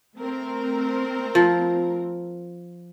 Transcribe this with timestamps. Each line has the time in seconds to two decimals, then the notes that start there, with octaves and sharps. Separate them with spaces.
0.18 A3 C4 A#4
1.35 F3